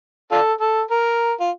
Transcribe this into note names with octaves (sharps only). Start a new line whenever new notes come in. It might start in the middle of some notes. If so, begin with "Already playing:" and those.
D4 F4 A4
A4
A#4
F4